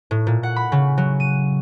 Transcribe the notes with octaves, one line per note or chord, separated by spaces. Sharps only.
A2
A#2
F#5
B5
C#3
F#3
D#7